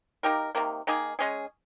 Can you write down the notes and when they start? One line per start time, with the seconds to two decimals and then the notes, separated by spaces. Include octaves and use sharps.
0.23 A#3 D#4 G4 A#4
0.55 C3 D#3 A#3
0.87 D#3 A#3 D#4 G#4
1.19 G#3 C#4 G#4